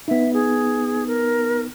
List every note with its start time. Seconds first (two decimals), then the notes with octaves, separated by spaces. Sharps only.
0.08 B3 D#4 E5
0.33 G#4
1.07 A#4